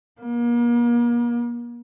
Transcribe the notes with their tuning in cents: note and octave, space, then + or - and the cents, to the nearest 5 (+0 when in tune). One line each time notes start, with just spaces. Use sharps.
A#3 +35